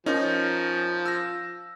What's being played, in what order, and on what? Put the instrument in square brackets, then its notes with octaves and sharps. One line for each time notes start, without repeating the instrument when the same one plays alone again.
[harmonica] F3 [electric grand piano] C#4 D#4 A#4
[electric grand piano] E6 A#6